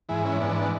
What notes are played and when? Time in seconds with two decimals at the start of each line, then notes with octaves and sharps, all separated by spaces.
0.09 G#2 E3 E4 G#4
0.25 C#4 E4
0.40 G#2 E3 B3 D4